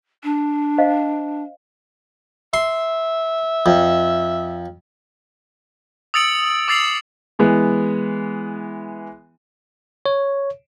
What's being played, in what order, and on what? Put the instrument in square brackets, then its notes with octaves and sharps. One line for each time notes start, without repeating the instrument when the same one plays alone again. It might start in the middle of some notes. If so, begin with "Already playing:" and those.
[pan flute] D4
[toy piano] C5 D#5 F5
[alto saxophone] E5 [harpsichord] C6
[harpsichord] F2
[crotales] D#6 E6 A6 C#7 D7 F#7
D6 E6 A6 C7 F7 F#7
[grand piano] E3 G#3 B3
[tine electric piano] C#5